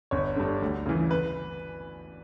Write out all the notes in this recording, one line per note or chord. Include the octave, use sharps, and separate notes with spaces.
G1 C#5
G2 D3
D2
C#3 E3
B4